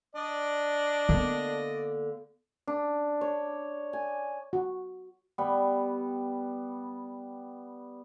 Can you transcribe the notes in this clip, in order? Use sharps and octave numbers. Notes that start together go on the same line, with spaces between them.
D4 D5 D#5
D3 A#3 B3
D4
C#5
G#5
F#4
G3 B3